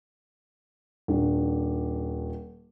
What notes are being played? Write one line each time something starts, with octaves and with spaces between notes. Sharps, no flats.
D#1 D4